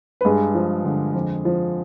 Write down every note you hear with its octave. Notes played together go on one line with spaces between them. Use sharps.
B4
G2 G#3 G#4
F3
D3
F2
F3